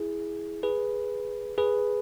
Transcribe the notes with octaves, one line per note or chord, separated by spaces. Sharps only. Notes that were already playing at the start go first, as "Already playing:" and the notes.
Already playing: E4 G#4
G#4 B4
G#4 B4